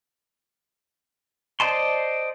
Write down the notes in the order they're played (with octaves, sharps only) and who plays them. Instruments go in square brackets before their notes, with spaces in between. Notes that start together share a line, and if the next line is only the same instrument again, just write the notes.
[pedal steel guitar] C5 D5 D#5 A5 C6